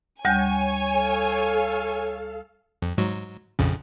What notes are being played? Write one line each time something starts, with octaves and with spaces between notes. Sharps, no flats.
D2 G3 C#5 G#5 G6
A4 F5
F2
G#2 F#3
A#1 F2 C#3